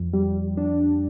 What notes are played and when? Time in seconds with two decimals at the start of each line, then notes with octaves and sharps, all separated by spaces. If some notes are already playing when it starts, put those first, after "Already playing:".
Already playing: F2
0.13 G3
0.57 D4